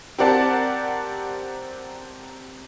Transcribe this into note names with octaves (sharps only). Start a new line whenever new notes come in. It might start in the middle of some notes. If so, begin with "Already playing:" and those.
C4 G4 A#4 D5 F#5 A5